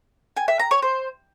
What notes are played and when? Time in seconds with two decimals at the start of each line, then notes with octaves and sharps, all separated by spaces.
0.37 G#5
0.48 E5
0.60 A#5
0.71 C#5
0.82 C5